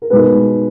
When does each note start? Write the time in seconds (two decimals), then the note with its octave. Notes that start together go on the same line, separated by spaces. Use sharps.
0.02 A#4
0.10 B2 G#3 D#4 B4